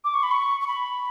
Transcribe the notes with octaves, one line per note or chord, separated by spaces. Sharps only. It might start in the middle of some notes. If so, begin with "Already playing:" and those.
D6
C#6
B5
C#6
C#6
B5